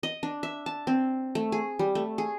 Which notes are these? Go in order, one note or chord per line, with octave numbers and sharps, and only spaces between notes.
D#5
D4
E5
A5
C4
A3
G#4
G3
A3
G#4